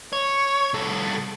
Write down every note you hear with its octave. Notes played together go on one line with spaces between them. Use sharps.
C#5
C2 A4